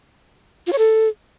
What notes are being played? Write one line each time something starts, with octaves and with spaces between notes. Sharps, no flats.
F4
C#5
A4